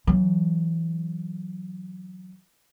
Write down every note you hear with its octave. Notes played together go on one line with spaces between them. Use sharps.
E3 F#3